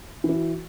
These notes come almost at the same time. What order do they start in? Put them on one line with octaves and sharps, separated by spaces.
E3 E4 F#4